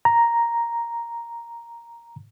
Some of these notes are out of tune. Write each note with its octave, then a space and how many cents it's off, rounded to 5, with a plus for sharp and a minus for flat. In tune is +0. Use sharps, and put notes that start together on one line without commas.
A#5 +0